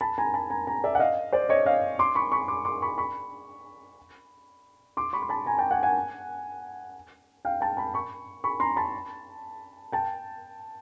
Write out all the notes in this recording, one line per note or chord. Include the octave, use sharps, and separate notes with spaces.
A5 B5
G#5 A#5
A5 B5
G#5 A#5
G#5 A#5
D5 E5
F#5
D#5 F5
C5 D5
C#5 D#5
D#5 F5
C6 D6
B5 C#6
B5 C#6
C6 D6
C6 D6
B5 C#6
B5 C#6
C6 D6
B5 C#6
C6
A5 B5
G#5 A#5
G5 A5
F#5 G#5
F#5 G#5
F5 G5
G5 A5
A5 B5
B5 C#6
B5 C#6
A#5 C6
A5 B5
G5 A5